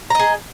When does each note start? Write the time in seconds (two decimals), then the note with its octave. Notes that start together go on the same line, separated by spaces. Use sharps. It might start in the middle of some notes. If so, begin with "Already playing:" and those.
0.10 A#5
0.15 D#5
0.19 G#4